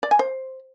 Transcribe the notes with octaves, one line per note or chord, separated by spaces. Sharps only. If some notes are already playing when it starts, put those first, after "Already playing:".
D5
G#5
C5